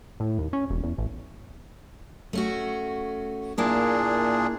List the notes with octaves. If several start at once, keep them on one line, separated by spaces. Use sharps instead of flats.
A2
D#2
C#4
E1
E2
A1
A3 C#4 F#4
A#2 A#3 D4 E4 G#4 F5